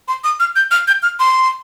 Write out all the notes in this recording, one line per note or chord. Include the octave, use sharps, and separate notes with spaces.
C6
D#6
F6
G6
F6
G6
F6
C6